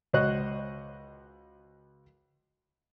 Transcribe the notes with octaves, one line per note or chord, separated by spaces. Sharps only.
C#2 F#4 C5 C#5 D#5 F#6